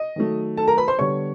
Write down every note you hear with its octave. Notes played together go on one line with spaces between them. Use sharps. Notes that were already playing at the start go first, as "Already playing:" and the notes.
Already playing: D#5
D#3 F#3 A3
A4 A5
A#4 A#5
B4 B5
C5 C6
D3 G3 B3 C#5 C#6